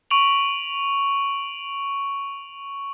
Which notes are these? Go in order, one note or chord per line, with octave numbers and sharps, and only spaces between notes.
C#6 D7 F7 F#7